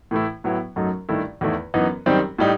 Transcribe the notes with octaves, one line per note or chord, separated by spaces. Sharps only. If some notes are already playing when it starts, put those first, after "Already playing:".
A2 E3 A3 E4
A2 F#3 B3 E4
F#2 F#3 A3 D#4
G2 D#3 A3 E4
E2 D#3 A3 E4
F#2 E3 B3 D#4
F#2 D#3 G3 C4 D#4
A2 G3 D#4